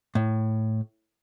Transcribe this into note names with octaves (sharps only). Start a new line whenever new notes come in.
A2